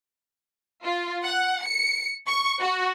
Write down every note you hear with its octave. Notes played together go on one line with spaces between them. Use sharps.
F4
F#5
C#7
C#6
F#4